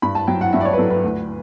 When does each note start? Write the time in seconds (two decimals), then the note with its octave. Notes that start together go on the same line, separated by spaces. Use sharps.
0.02 G2 B5
0.15 A5
0.27 F#3 G5
0.41 F#5
0.53 G2 E5
0.61 D5
0.65 C#5
0.73 B4
0.78 F#3 A4
0.91 B4
1.04 D2